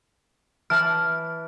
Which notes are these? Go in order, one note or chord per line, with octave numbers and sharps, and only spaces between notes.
E3 A5 F6 F#6